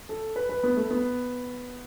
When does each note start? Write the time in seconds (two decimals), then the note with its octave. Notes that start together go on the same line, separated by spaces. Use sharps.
0.09 A4
0.36 B4
0.49 B4
0.63 B3
0.77 A3
0.90 B3